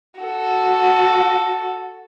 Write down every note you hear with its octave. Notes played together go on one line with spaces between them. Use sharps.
F#4 A4